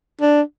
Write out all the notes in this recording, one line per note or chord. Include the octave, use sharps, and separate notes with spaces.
D4